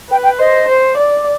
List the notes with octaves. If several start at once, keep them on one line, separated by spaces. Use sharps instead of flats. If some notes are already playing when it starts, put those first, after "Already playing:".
B4 G5
G5
C5 D#5
C5
D5